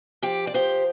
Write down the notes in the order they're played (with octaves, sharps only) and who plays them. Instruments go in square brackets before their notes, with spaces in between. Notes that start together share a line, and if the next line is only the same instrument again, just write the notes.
[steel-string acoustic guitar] F3 G4
D5
F3 G4 C5